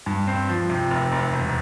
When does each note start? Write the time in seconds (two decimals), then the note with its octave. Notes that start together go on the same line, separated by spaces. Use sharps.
0.06 G2
0.27 C4
0.49 F3
0.70 C3
0.90 F1
1.12 F1
1.33 E1